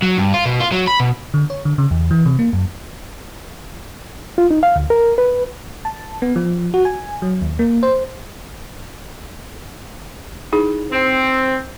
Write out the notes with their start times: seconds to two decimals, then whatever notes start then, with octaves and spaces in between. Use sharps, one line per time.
0.02 F#3
0.18 G2
0.34 F4
0.46 B2
0.61 F4
0.72 F#3
0.87 B5
1.00 B2
1.34 D3
1.50 C#5
1.65 D3
1.78 C#3
1.91 E2
2.11 E3
2.26 C3
2.39 A#3
2.53 F#2
4.38 F4
4.51 D#4
4.63 F5
4.76 D2
4.90 A#4
5.18 B4
5.85 A5
6.22 B3
6.36 F3
6.74 F#4
6.85 G#5
7.22 F#3
7.41 D#2
7.59 A#3
7.83 C5
10.53 D#4 E4 G#4
10.92 C4